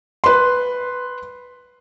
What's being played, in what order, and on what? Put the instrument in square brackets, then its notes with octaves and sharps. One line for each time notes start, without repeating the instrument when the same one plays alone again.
[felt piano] B4 C6